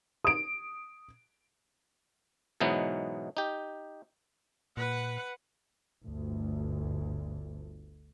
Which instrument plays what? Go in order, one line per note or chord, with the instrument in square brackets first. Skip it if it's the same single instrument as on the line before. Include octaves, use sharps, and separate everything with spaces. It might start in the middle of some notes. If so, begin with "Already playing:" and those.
[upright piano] D#6 D7
[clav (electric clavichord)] G#2 B2 E3 F#3 B3 D#4
D#4 G4
[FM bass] A#2 [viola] B4 F#5
[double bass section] G1 D2